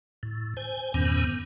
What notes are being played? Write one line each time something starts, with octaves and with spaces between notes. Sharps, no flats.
A2
C5 G#5
E2 G2 A#2 D#3 B3 C#4